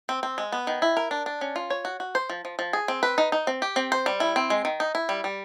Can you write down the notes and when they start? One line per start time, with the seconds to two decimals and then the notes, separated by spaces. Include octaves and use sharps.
0.09 C4
0.23 C4
0.38 G#3
0.52 B3
0.67 D#3
0.82 E4
0.97 A#4
1.11 D4
1.26 D4
1.41 C#4
1.56 F4
1.70 C#5
1.85 F#4
2.00 F#4
2.15 C5
2.30 F3
2.45 F3
2.59 F3
2.73 G#4
2.88 C4
3.03 B4
3.18 D#4
3.32 D#4
3.47 C4
3.62 G4
3.76 C4
3.92 C5
4.06 G3
4.20 E4
4.36 C4
4.50 G#3
4.65 D#3
4.80 D#4
4.95 E4
5.09 G3
5.24 G3